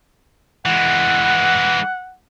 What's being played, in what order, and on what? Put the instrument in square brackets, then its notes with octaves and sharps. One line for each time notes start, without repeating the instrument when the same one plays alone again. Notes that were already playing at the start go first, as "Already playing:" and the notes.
[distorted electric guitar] E3 G#3 [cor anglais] F#5